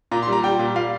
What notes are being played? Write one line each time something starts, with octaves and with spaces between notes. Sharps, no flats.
A#2 A#5
C6
G3 A#5
G3 G5
A#2
A#2 F5